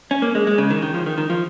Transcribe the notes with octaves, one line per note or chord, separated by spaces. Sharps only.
C#4
A#3
G#3
G#3
C#3
D#3
D#3
F3
D#3
D#3
F3